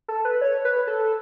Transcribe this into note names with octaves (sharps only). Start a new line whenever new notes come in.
A4
B4
C#5
B4
A4